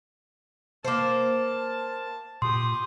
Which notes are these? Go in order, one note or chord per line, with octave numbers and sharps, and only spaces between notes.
A#3 C5 A5
A#2 G4 C6 D#6